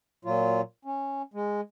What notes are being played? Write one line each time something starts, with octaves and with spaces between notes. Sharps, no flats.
A#2 F#3 F4
C#4
G#3